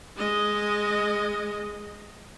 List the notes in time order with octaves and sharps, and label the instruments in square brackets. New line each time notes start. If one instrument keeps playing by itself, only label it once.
[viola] G#3 D#5